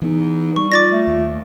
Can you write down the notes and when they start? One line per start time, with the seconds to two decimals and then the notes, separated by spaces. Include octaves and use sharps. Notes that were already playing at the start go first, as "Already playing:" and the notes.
0.02 E3 B3 D#4
0.56 G3 C#6
0.72 F4 D5 D6 A6 A#6
0.92 A3
1.07 D#2